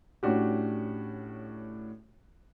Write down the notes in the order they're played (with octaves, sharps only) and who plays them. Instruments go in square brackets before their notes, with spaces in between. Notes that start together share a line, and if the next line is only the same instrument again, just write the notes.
[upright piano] A2 C#4 D4 F#4 G4